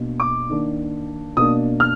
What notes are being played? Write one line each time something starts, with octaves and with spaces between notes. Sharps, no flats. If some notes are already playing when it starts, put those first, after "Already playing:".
Already playing: B2 A#3 D4
D6
D#3 A#3 D4
B2 A#3 D4 D#6
F6